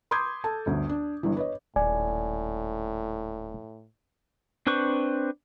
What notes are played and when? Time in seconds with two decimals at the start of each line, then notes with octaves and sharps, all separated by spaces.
0.11 B5 C6 D6 D#6 G6 G#6
0.44 A4 A5
0.66 G1 D2
0.89 D4
1.23 G1 G2 E3
1.37 B4 C#5 D#5
1.76 D#1 A2 D5 G#5
4.67 C4 D4 B4 C5 C#6